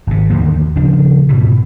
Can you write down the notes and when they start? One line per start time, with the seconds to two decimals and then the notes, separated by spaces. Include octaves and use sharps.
0.07 G#1 C3
0.30 D#2 D3 D#3 A#3
0.76 D#1 C#3 F3 D4
1.29 G#2 B2 D3 E3